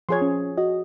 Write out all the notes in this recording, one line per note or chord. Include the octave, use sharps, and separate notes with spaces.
F3 G#4 C#5 C6 G#6
C#4
F#4 D#5